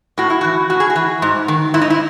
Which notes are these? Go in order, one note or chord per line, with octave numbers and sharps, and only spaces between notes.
A2 F#4
E4
E3 F#4
A2 F#4
G#4
F#4
E3
G#2
D#3
G#2 E4
D#4
E4